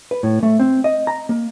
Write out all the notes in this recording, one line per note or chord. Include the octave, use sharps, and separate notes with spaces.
B4
A2
A3
C4
D#5
A#5
A#3